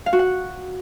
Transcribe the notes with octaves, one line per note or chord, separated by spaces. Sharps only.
F5
F#4
F#5